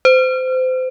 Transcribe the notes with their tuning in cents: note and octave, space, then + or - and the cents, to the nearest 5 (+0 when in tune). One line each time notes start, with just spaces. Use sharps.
C5 -30